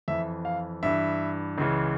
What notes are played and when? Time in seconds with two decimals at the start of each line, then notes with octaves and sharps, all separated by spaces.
0.08 F2 E3 E5
0.45 F5
0.83 G2 E3 E5
1.58 C#2 C#3 E3